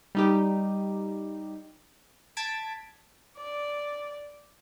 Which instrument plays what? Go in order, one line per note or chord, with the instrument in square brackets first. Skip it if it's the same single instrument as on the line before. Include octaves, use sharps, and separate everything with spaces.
[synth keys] G3 D#4 G4
A5 G#6 A6 B6 D7
[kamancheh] D5